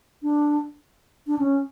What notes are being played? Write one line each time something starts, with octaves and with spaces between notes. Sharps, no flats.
D4
D4
C#4